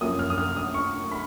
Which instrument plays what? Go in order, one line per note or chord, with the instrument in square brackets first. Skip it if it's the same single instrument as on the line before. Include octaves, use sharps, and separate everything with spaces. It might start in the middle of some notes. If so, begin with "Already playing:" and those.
[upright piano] F#2 F3 A#3 C#4 D#6
F6
D#6
F6
D#6
C#6
B5